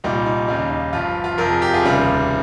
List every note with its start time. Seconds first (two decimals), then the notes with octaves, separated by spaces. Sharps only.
0.04 C2 A#2 G3 D#4
0.26 D#4
0.48 D#2 C#3 G3 D#4
0.70 D#4
0.93 G1 G2 F3 F4
1.24 F4
1.38 F2 C3 F3 A#4
1.50 G#4
1.62 G4
1.74 F4 G#4
1.83 F1 D#2 C#3 G3